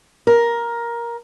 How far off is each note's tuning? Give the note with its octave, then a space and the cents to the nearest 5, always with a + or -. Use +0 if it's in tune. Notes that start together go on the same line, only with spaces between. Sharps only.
A#4 +10